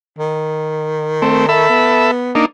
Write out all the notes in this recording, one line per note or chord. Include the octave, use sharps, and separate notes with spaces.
D#3
A3 C4
A4 E5 B5
B3
A#3 D4 D#4